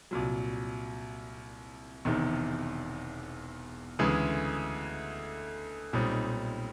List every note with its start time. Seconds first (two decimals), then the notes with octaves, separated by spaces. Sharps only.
0.11 C2 A#2 F#3
2.05 E1 E2 C3 D#3
3.99 D2 C#3 E3 G#3
5.93 B1 A#2 G3 C4 D#4